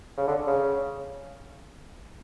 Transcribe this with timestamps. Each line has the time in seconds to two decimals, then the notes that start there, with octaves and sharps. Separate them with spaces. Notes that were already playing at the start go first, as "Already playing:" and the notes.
0.18 C#3
0.28 D3
0.47 C#3